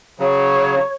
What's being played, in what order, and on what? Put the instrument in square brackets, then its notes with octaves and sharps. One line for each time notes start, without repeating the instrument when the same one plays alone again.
[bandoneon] C#3 F#3 [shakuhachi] C#5